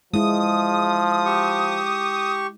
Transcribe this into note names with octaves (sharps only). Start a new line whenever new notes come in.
F3 G#3 E4 D#6
G4 C#6